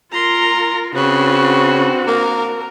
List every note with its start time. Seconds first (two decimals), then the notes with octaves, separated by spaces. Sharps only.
0.12 F4 A#4 A#5 C6
0.95 C#3 C4 D4 F#4 B4
2.08 A#3 A#4